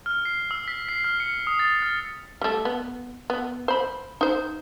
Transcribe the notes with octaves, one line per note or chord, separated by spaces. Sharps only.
F6
C7
E6
B6
C7
F6
C#7
D#6
A6
F6
G3 A3
B3
B3
C5 B5
D#4 C5